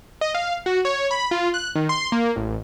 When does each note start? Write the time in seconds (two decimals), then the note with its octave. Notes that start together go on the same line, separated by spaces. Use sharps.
0.21 D#5
0.35 F5
0.66 F#4
0.85 C#5
1.11 B5
1.31 F4
1.54 F#6
1.75 D#3
1.89 C6
2.12 A#3
2.36 A1